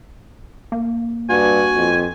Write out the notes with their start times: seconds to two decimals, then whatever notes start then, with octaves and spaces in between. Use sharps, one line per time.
0.72 A#3
1.29 G2 F#4 G#5
1.76 F2